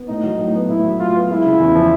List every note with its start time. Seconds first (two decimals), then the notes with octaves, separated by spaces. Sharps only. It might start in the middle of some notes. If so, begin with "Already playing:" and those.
Already playing: B3
0.08 A2 D#4
0.23 F#3
0.39 A2
0.54 B3
0.69 A2 E4
0.84 F#3
1.00 A2 F4
1.15 B3
1.30 G#3 E4
1.45 C#3
1.60 E2
1.75 F3